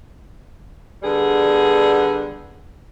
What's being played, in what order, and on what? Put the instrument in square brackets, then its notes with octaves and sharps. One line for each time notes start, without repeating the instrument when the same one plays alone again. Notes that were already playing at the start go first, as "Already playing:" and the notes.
[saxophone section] D3 G3 B3 G#4